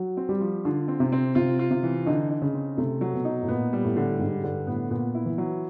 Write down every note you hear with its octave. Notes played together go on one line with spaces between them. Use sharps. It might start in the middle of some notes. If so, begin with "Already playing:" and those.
Already playing: F#3
C4
G3
F3
D3 F4
C4
C3
C4
C3 F4
F4
C3
E3
D3 D#4
D#4
C#3
C4
C3 A3
F#3
B2
D#4
A2
A#2 B3
G3
A2
D3
G#2 G3
G2 D3
A2 B3
A#2 B3
E4
E3
F#3